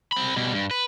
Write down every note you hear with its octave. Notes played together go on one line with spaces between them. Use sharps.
C4 B5
B2 G3
G2
B4